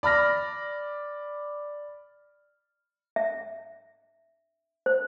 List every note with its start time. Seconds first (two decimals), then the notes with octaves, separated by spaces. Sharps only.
0.03 D5 B5 F6 A#6
3.16 E5
4.86 C5